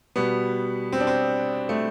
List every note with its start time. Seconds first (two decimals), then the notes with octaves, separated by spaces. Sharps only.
0.16 B2 G3 B3
0.92 C4
1.00 D4
1.07 C4
1.69 A3